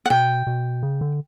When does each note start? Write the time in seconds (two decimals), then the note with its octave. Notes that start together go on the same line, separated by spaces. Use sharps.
0.06 F#5
0.10 B2 G5
0.47 B2
0.83 C#3
1.01 D3